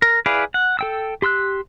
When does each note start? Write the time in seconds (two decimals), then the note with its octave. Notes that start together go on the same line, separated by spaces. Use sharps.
0.02 A#4
0.26 E4 G#4 B4 D5 F5
0.54 F#5
0.79 A4 G5 E6
1.22 G4 C6 E6 F#6